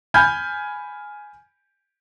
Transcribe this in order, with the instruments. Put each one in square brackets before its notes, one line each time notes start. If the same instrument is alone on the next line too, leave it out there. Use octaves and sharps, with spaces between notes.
[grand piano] G#5 B5 F6 G6 G#6